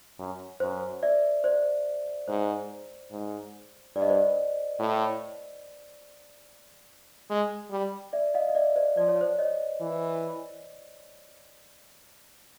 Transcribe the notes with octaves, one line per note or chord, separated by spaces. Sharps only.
F#2
F#2 C5
D5 E5
C5 D5
G#2 C5
G#2
G2 D5
D#5
C5 D5
A2
G#3
G3
D5 E5
D#5 F5
D#5
D5 E5
C5 D5
F3 D5
C#5
C5 D5
C#5 D#5
E3